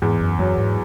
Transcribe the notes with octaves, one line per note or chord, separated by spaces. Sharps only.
E2 G#2
F#2
F#2 F#3
G#2